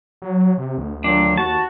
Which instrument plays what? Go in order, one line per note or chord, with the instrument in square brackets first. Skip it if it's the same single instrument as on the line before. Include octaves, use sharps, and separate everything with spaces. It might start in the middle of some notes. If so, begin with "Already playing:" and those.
[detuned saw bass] F#3
C3
D2
[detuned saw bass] D2 [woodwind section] A#2 D#3 F#3 [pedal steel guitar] D4
[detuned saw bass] D#2 [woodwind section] F#4 [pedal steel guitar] A5